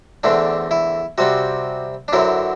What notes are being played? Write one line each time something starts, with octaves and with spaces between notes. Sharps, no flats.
E2 D3 A3 C4 D4
E4
C3 G3 C4 F#4
D4
F#2 D3 F#3 C4 E4